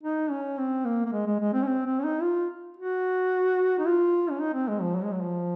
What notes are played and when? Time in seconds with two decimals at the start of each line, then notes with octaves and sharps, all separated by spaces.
0.03 D#4
0.31 C#4
0.58 C4
0.85 A#3
1.05 A#3
1.13 G#3
1.26 G#3
1.40 G#3
1.53 C4
1.63 C#4
1.67 C4
1.86 C4
1.99 C#4
2.04 D#4
2.22 F4
2.77 F#4
3.79 D#4
3.87 F4
4.30 C#4
4.41 D#4
4.54 C4
4.68 G#3
4.81 F3
4.96 F#3
5.04 G#3
5.12 F#3
5.22 F3